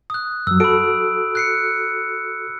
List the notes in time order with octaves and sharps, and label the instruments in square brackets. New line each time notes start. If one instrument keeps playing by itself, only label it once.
[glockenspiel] D#6 F#6
[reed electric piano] F#2 F#3 [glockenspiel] E6
[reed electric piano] F#4 A4 [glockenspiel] B5 D7
[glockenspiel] F#6 C7 C#7